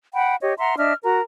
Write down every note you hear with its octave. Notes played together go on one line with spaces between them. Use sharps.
F#5 G5 B5
G4 C#5 D#5
E5 F#5 A#5 C6
D4 D#5 E5 F6
F#4 A#4 A#5